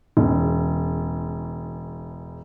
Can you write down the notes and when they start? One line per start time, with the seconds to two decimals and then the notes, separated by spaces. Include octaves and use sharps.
0.17 E1 E2 C#3